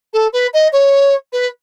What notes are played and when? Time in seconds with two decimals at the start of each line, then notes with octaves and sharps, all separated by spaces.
0.13 A4
0.33 B4
0.54 D#5
0.73 C#5
1.33 B4